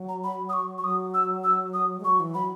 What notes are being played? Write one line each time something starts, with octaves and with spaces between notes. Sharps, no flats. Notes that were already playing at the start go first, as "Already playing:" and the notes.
Already playing: F#3
A#5
B5
D#6
C#6
C#6
F#3 D#6
E6
E6
D#6
G#3
F#3 C#6
E3
F#3 B5